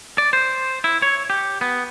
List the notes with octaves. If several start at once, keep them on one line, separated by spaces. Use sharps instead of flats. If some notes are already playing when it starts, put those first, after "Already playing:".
D5
C5
E4
C#5
G4
B3